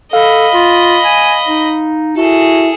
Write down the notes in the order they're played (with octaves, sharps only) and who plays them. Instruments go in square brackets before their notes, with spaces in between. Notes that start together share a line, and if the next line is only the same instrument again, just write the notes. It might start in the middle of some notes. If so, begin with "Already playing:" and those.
[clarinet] A4 [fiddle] D#5 B5 [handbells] F5
[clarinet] F4
G#5
D#4
[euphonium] E4 [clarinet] F#4 [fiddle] G#4 A4